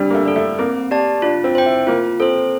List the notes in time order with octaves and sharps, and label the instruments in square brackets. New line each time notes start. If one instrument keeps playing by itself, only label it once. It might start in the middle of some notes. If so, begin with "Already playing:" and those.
Already playing: [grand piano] G3 C4 [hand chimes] D4
[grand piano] A#3
A3
[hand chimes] A4 D5
[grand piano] A3
[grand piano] A#3 [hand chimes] C4
[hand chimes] G4 D5 A5
[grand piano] D4 [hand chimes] F4
[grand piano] C4
[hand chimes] C5 G5
[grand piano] E4
[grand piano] A#3 [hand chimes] F4
[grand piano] C4 [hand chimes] A4 C5